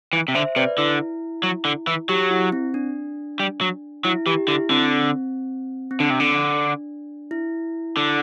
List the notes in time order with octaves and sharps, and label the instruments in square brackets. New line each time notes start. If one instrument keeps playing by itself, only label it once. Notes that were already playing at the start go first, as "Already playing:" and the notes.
[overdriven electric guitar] E3
C3
[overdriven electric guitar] D3 [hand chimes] C5 E5
[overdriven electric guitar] C3 [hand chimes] B4 D5
[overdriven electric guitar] D3 [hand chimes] E4
[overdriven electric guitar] F#3
D3
E3
[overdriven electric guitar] F#3 [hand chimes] G4
[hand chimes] E4
C4
D4
[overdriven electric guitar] G3
F#3
[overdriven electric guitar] F#3 [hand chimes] E4
[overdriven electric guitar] E3 [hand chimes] G4
[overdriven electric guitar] D3 [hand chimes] E4
[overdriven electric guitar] D3 [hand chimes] C4
[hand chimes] C4
[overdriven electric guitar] D3 [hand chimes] D4
[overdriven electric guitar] C3
D3
[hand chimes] E4
[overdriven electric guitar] D3